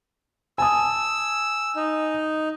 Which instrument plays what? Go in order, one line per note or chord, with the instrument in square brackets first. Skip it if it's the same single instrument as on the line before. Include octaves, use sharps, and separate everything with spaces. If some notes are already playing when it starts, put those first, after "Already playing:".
[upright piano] G#5 A5 D#6 [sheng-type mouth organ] E6
[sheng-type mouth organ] D#4